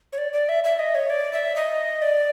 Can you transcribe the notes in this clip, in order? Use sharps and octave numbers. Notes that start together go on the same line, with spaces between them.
C#5
D5
D5
E5
E5
D#5
C#5
D5
E5
D#5
D5